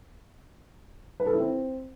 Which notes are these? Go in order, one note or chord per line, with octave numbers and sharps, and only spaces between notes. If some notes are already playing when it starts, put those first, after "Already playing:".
B4
A4
E4
C4